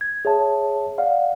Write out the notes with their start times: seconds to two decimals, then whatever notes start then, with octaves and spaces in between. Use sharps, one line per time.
0.01 G#6
0.25 G#4 C#5 E5 A5
0.98 D5 F5 F#5